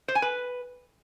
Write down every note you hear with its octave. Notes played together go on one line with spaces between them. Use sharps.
C5
G#5
B4